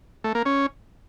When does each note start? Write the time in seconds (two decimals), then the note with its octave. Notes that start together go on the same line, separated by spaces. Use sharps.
0.24 A3
0.35 A#3
0.45 C#4